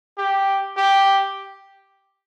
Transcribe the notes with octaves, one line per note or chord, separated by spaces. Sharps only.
G4
G4